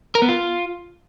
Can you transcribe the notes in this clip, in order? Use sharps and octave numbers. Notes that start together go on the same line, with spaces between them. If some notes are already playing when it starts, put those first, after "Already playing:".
A#4
B3
F4